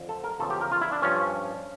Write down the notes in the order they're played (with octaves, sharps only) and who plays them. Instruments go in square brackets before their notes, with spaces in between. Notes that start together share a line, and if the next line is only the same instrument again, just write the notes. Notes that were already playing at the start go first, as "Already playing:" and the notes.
Already playing: [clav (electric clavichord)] F2 D3 F3
A4
A#4
E2 C#3 F3 A4
G4
A#4
F4
E4
D4
G2 F3 C#4